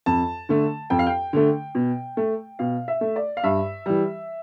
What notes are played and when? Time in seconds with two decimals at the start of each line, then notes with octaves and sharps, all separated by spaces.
0.06 F2 A5
0.49 D3 A3
0.90 F2 G5
0.99 F5
1.06 G5
1.33 D3 A3
1.75 B2
2.17 A3
2.59 B2 F5
2.88 E5
3.01 A3
3.16 D5
3.37 F5
3.43 G2 E5
3.86 E3 G3